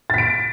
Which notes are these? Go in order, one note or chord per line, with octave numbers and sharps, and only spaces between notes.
A6 B6 D7